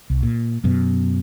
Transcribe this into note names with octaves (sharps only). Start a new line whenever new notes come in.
C2
A#2
F#2 B2